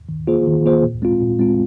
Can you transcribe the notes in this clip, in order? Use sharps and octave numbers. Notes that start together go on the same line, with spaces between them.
D#3
A#3 F4 G#4 C5
D#3
A#3 F4 G#4 C5
A#2
G#3 C4 F4
A#2
G#3 C4 F4